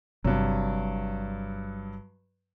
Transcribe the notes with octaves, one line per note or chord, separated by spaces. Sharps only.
G1 G2 C3 F#3